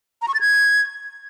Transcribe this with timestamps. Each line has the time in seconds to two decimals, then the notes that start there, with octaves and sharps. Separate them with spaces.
0.22 A#5
0.28 C#6
0.34 A6
0.41 G#6